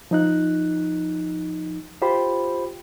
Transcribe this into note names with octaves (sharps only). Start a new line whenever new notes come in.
F3 D#4 F#6
F4 G4 C5 G5 B5